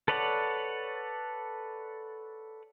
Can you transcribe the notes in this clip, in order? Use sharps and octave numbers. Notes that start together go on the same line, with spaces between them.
A4 B4 C#5 D5 F#5